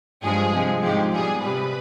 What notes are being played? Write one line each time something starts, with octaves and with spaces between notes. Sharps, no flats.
G2 F3 G#3 G#4
C3 F3 G#3
G#2 F3 G#3 G4
B2 G3 G#4
C3 G3 B4